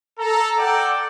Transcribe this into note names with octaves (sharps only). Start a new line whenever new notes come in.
A4 A#5
A4 D5 F#5 G5